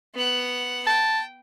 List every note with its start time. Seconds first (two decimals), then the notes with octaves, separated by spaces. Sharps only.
0.14 B3 F#5
0.87 G5 A5